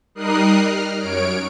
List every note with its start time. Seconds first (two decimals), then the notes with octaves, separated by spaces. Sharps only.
0.15 G3 D#4 A#4 D#6 F#6 C7
0.61 F6
0.99 F#2 C#5 D7